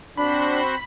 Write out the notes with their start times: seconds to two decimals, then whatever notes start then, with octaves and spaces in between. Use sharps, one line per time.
0.17 C4 D4 F#4 C5 B5